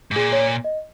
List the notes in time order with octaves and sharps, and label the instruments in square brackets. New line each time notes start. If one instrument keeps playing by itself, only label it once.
[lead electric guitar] G#2
[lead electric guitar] A#2 [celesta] G#4
[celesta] C#5
D#5